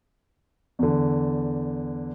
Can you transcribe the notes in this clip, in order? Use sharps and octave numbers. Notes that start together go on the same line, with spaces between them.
E2 D3